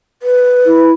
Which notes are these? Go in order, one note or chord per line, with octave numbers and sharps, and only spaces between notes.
B4
E4